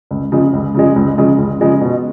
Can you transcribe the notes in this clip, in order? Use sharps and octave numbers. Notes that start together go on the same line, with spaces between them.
C#2
C#3 F3 G#3
C#2
C#3 F3 G#3
C#2
C#3 F3 G#3
C#2
C#3 F3 G#3
B2